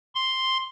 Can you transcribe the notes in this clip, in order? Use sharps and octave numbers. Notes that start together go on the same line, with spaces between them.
C6